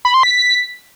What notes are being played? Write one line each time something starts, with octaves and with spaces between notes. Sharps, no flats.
B5
C6
B6